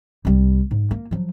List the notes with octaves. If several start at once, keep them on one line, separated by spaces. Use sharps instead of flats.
C2 G3
G#2
A#3
F3 F#3